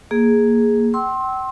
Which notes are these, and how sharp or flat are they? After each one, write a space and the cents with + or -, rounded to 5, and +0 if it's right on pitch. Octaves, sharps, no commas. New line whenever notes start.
A#3 +0 G#4 +0
G5 -40 C6 +20 E6 -20